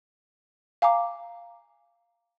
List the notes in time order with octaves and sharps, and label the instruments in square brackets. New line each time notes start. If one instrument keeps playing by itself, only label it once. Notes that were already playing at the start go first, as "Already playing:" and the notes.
[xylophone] F5 G#5 A#5 D6